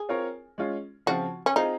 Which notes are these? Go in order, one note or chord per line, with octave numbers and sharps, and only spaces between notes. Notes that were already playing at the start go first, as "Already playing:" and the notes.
Already playing: G#4
C4 F4 A#4 C#5
G#3 C#4 F4
C#3 F3 C4 F4 F#4
C#4
C4 D#4 F4 G#4 D#5